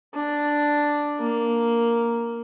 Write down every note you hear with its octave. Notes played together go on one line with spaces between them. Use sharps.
D4
A#3